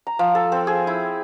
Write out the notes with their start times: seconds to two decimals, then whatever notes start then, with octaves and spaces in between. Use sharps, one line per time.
0.07 A#5
0.19 F3
0.35 A4
0.52 C4
0.67 G#4
0.87 E4